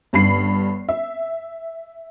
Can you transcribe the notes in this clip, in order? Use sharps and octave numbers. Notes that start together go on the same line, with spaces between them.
G1 G2 B5 C7
E5